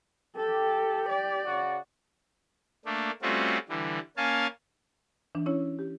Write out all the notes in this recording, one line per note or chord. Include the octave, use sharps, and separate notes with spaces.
G4 A4
D5
C#3 F#4
A3 A#3 D4
G3 A3 C4 C#4 F4 F#4
D3 E3 G3
A#3 C#4 F5 G#5 A5
E3 D4
C#4 E4 C#5
G4